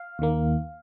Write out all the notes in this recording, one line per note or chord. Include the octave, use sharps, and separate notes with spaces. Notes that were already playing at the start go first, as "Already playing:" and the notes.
Already playing: F5
D#2 D#3 A#3